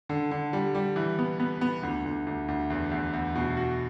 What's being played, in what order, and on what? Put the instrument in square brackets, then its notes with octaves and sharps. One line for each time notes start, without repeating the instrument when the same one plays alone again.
[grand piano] D3
D3
G3
G3
E3
B3
B3
B3
D2
D2
D2
D2
E2
E2
E2
B2
F#4